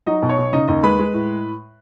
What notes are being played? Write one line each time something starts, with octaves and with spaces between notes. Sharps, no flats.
F#3 D#4 D#5
B2
C#5
B1
C#3 D#4 D#5
D#2 D#4 D#5
G#3 B4 B5
G#3
A2